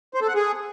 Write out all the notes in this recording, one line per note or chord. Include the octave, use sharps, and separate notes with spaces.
C5
A4
F#5
G#4